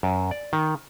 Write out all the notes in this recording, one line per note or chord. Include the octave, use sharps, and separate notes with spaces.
F#2
D5
D#3